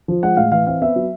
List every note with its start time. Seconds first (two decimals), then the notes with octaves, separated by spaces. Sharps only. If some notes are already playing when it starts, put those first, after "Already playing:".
0.08 F3
0.23 G#3 F#5
0.37 A2 F5
0.51 E3 F5
0.67 C4 F5
0.82 B3 E5
0.96 F#3